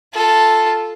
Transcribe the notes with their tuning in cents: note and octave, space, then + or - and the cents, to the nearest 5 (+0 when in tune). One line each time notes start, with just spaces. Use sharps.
F4 +0 A4 +0